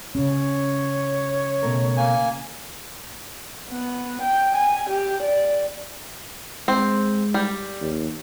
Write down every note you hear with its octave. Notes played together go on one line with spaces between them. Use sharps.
C#3 C#4 C#5
B2 A3 A#4
A#3 G#5
B3
G5
G#5
G4
D5
G#3 C4
G3
D#2